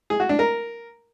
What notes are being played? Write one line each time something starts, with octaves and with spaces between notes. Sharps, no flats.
G#4
F#4
D4
A#4